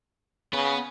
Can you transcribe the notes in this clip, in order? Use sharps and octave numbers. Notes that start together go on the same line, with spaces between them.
C#3 B3 B4